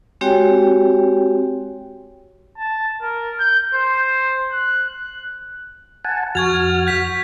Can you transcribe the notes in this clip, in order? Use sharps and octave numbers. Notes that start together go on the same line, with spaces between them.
G#3 C4 F#4 G4 C#5 G5
A5
A#4
G6
C5
F#6
F#6
F#5 G#5 A5
F2 F#4 C#6 F6 G#6 A6
G6 B6